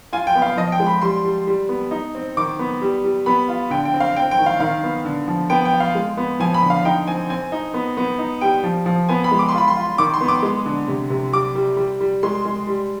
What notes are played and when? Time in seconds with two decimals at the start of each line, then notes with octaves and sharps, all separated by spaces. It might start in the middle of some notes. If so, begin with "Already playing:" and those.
0.13 F4 G#5
0.27 G5
0.35 B3
0.42 F5
0.57 F3 D#5
0.72 G5
0.80 G#3
0.87 B5
1.01 G3 C6
1.25 G3
1.47 G3
1.69 B3
1.91 D#4
2.15 C4
2.37 D#3 D6
2.59 B3
2.82 G3
3.04 G3
3.26 B3 B5
3.49 F4
3.70 D3 G5
3.85 G5
3.94 C4
4.00 F5
4.15 C4 G5
4.31 G5
4.39 D#3
4.46 F5
4.60 D#3 F5
4.84 B3
5.05 D3
5.28 F3
5.50 B3 G5
5.65 G5
5.72 F4
5.80 F5
5.95 G#3
6.17 B3
6.40 F3 G#5
6.54 B5
6.62 D3
6.70 F5
6.85 D#4 G5
7.07 C4 G#5
7.29 C4 G#5
7.52 D#4
7.74 B3
7.97 B3
8.19 D#4
8.41 G3 G5
8.63 F3
8.86 F3
9.09 B3 G#5
9.24 B5
9.32 G#3
9.39 D6
9.49 C6
9.54 F4 B5
9.68 C6
9.76 F4
9.98 D#3 D6
10.14 C6
10.21 B3
10.28 D6
10.43 G#3
10.66 D3
10.88 C3
11.10 C3
11.32 G3 D6
11.55 G3
11.77 G3
12.01 G3
12.23 G#3 C6
12.45 G#3
12.67 G3